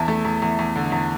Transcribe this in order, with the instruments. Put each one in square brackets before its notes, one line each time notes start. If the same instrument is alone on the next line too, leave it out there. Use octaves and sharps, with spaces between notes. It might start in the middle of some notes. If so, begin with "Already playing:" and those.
Already playing: [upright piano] E2 E5 A5
A3
E2
E2
E2
D3
E2